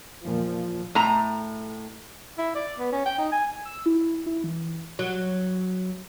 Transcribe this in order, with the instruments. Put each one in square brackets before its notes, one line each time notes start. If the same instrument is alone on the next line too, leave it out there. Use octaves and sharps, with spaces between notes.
[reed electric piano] E2 A#2 [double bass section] F3
[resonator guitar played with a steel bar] A2 A#5
[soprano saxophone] E4
D5
B3
C#4
G5
D#4
G#5
[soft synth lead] E6
E4
E4
E3
[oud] F#3